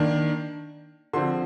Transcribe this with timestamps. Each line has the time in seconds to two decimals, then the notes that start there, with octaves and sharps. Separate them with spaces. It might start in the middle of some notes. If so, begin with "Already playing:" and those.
Already playing: D#3 A#3 D4
1.13 D3 F3 C4 C6